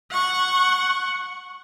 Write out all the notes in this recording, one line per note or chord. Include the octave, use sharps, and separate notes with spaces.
F#5 C#6